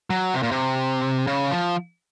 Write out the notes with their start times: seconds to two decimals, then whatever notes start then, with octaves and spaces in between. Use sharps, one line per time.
0.10 F#3
0.34 C3
0.43 A#2
0.51 C3
1.27 C#3
1.51 F3